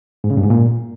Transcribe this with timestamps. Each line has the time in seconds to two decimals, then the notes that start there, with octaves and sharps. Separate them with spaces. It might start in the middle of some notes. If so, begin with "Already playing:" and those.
0.24 G#2
0.31 C#3
0.37 G2
0.44 G#2
0.50 A#2